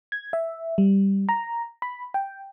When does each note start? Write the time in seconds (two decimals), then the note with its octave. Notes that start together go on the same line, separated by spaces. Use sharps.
0.12 G#6
0.33 E5
0.78 G3
1.29 A#5
1.82 B5
2.14 G5